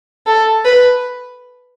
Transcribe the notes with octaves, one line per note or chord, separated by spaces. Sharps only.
A4
B4